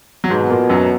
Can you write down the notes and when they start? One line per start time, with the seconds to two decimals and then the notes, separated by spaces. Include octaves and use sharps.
0.24 F#3
0.30 G#2 B2 G#3
0.50 A#2 A#3
0.69 F#2 F#3